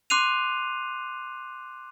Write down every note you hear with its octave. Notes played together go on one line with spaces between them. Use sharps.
C6 D6 F#6 C7 D#7 F7